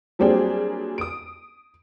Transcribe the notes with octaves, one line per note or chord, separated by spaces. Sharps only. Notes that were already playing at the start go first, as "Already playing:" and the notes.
F#3 G3 A#3 C4 D4 G#4
D#6 D7